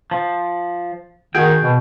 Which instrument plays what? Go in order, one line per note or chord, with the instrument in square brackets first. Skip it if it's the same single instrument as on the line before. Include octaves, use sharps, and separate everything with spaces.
[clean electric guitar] F3
[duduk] D#3 [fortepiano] F#4 G#4 [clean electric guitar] G5
[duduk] B2